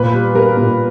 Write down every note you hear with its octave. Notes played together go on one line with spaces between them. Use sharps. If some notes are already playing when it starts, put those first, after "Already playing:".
Already playing: A#2 B4
G3
G3 A#4
A#2